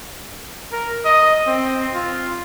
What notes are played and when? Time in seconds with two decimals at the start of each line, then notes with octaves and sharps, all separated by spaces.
0.72 A#4
1.05 D#5
1.47 C4
1.94 F4